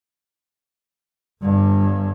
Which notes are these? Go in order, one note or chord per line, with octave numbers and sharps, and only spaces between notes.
G1 G2